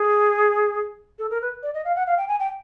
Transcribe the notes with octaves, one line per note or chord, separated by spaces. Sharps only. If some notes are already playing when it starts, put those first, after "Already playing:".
Already playing: G#4
A4
A#4
B4
D5
D#5
F5
F#5
F5
G5
G#5
G5